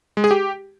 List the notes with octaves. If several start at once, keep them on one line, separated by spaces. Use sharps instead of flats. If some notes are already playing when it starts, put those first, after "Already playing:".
G#3
G#4
G4